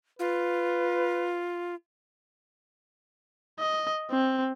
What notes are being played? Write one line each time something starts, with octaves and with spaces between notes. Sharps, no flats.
F4 B4
D#5
C4